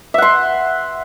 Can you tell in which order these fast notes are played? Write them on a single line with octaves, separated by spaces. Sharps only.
E5 F#5 C6